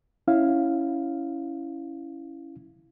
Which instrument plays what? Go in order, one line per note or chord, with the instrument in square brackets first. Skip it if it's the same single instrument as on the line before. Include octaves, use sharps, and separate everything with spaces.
[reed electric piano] C#4 E4 F5